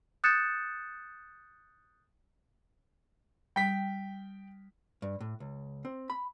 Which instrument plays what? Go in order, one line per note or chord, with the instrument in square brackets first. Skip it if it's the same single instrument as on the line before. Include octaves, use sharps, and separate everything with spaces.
[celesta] D#6 F#6 G6 A6 C#7 E7
[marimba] G3 [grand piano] G5 B6
[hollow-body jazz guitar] G2
A2
C#2
C4
B5